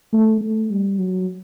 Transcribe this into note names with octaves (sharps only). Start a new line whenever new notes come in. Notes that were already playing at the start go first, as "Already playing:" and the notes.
A3
A3
G3
F#3